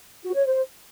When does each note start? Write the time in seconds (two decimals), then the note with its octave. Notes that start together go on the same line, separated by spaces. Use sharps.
0.23 F#4
0.34 C#5
0.46 C5